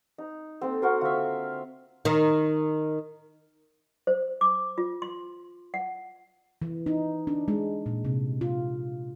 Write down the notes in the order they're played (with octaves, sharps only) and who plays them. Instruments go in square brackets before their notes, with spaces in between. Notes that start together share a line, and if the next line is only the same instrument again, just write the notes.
[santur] D#4
[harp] A#3 G4 A4 [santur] C4
[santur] F#4 A#4 C5
[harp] D3 C#6 [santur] F4 E5
[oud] D#3
[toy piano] C5
D6
F4
C6
F#5
[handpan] E3
D#4
D4
G#3
A#2
C3
F4